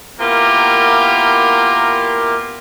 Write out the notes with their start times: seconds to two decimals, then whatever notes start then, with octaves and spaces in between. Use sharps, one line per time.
0.19 A#3 B3 E4 F4 G4 A#4